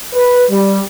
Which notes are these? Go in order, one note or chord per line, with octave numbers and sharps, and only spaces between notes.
B4
G3